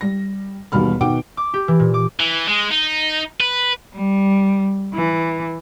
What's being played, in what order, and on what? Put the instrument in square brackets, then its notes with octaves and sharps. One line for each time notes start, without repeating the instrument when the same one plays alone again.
[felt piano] G3 A#6
E1 D#2 B2 G3 B5 F6
B2 D#3 F#5 G5 D6 D7
[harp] D6
G4
E3
A#2
D6
[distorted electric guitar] E3
G#3
D#4
B4
[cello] G3
E3